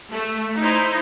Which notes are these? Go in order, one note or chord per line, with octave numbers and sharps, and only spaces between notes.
A3
D#4 E4 C5